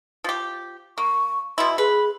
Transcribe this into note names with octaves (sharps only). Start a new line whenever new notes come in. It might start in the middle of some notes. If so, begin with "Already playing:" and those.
F3 G4
A#3 C#6
B2 E4 C6
G#4 B4